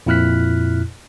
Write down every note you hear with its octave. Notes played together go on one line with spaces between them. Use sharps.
F2 A#2 E4 F6 F#6 B6